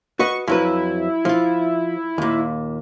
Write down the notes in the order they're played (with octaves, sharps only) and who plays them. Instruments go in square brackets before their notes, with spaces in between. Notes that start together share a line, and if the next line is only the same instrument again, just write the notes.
[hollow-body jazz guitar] F#4 B4 D#5 [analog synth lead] C#6
[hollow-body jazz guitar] F2 F#3 B4 [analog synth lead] E4
[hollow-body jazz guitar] F3 F4
D#2 A#2